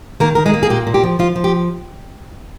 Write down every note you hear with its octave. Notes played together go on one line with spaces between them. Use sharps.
D#3 A#3 A#4
D#3 A#4
G#3 G#4
A#3
G#4
A#2 G4
A#2
G4
F3
F3 F4
F3
G4